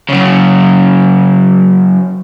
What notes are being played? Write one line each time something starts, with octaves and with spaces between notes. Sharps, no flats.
C#3 F#3